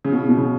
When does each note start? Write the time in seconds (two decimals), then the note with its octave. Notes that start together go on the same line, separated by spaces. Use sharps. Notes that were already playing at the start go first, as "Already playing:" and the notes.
0.05 C#3
0.12 B2
0.29 B2
0.37 C#3